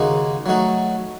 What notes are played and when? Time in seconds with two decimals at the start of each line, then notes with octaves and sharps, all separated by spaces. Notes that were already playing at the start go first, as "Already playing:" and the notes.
Already playing: D#2 C#3 G#3 D#4 F#4
0.46 F#3 A3 D#4 F#4